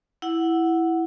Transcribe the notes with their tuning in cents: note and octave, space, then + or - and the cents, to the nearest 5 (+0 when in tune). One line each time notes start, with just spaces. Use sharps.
E4 +0 F#5 +0